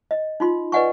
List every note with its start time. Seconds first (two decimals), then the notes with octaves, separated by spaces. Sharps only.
0.11 D#5
0.40 D#4 F4 C6
0.72 B4 D5 D#5 F#5 G#5 C#6